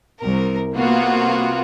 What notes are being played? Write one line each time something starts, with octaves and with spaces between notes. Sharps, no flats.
C2 A#4
C3 A#3 B3 F4 F#4